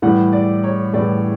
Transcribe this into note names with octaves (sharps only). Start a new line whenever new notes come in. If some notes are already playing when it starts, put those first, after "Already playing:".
A2 E3 G3 F#5
D5
C#5
A2 E3 G3 D5